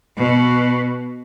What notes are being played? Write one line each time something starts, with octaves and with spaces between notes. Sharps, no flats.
B2